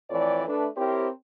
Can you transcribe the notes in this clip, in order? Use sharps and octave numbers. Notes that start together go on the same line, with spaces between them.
F2 A2 E3 C#5 D5
A3 D4 B4
C4 E4 G4 A#4 C5 C#5